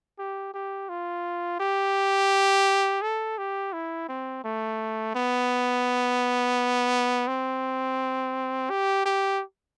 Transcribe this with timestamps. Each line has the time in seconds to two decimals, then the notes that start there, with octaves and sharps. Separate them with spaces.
0.19 G4
0.54 G4
0.89 F4
1.60 G4
3.02 A4
3.38 G4
3.73 E4
4.09 C4
4.44 A3
5.15 B3
7.28 C4
8.70 G4
9.05 G4